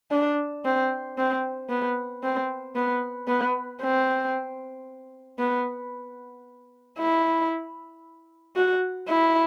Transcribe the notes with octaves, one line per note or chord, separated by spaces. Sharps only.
D4
C4
C4
B3
C4
B3
B3
C4
B3
E4
F#4
E4